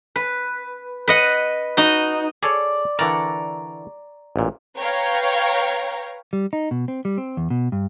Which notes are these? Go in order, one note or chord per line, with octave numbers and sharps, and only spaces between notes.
B4
B4 D#5 F#5
D#4 F#4
G#4 A4 C#5 D5
D3 E3 A#4 D5 A#5 C#6
A1 A#2
B4 C#5 F5 G5 A#5
G3
D#4
B2
C4
G3
C4
E2
B2
G2